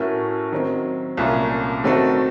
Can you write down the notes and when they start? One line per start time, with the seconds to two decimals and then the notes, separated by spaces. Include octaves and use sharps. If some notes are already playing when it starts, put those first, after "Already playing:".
Already playing: A2 A3 C#4 F#4 A#4
0.52 D#3 F#3 C4
1.17 C2 A#2 A3 C#4
1.84 D#3 A3 C4 F#4 A4